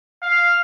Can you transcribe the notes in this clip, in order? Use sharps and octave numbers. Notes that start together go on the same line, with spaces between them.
F5